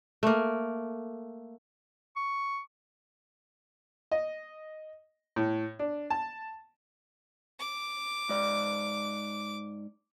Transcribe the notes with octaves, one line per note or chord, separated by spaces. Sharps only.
A3 A#3
C#6
D#5
A2
D4
A5
D6
G#2 D5